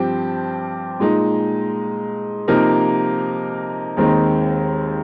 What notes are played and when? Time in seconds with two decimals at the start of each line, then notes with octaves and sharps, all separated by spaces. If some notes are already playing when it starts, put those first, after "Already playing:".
Already playing: G2 F3 C4 G4
1.00 A#2 G#3 D#4
2.48 C3 F3 A#3 D#4 A#4
3.97 D#2 D#3 G#3 C4 D#4